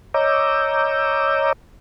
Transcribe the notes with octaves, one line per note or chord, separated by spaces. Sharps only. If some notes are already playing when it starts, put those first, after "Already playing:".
C#5 D#5 A#5 D6 E6 G6